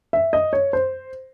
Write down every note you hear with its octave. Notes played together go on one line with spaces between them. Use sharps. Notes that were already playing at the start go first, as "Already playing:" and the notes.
E5
D#5
C#5
C5